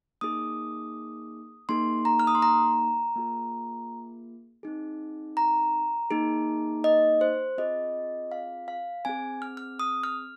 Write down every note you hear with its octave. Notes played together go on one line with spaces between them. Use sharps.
A#3 D#4 G#4 D#6
A#3 D#4 G#4 C6
A#5
F6
D#6
C6
A#5
A#3 F4 G#4
C4 D#4 G#4
A#5
A#3 D#4 G#4
D#5
C5
C4 F4 G#4 D#5
F5
F5
C4 G#4 G#5
F6
F6
D#6
F6